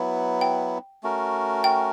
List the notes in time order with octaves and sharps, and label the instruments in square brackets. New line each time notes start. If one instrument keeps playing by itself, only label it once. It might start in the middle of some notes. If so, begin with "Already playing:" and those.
Already playing: [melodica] F#3 B3 E4
[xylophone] G5
[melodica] A3 C#4 F#4 A#4
[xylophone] G5